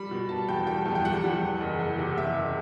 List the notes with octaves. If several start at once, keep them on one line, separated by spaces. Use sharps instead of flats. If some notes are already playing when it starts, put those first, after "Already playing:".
Already playing: G3 B5
B2
G3 A5
E2 G5
G3 G5
E2
G5
G3 F#5
G3
E2
F#1
E2
C3
E2 E5
F#1